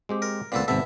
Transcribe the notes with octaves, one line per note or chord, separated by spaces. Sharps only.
G#3 C4 G4
A#4
C#2 A#2 B3 C4 A4
G#1 C3 B3 A4 E5